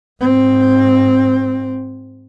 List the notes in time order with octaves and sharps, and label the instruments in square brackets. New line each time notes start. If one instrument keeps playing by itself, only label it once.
[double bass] G#2 C4